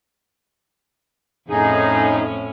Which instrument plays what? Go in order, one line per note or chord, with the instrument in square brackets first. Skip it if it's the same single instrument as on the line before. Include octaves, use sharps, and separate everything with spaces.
[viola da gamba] F2 A2 C#4 [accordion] D#4 G#4